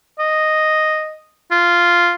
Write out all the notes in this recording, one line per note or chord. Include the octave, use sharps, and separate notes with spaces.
D#5
F4